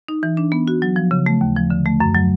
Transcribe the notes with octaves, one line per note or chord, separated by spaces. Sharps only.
D#4
E3
D4
B3
F#4
F#3
F3
C#3
A3
D#2
F3
D3
A3
F#2
F#3